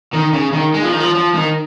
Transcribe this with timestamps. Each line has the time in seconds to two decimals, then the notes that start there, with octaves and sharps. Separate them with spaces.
0.13 D#3
0.33 C#3
0.53 D#3
0.74 G#3
0.82 F3
0.92 D#3
1.01 F3
1.15 F3
1.35 D#3